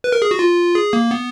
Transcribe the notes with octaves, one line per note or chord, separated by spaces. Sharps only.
B4
A#4
G#4
F#4
F4
G#4
A#3
B3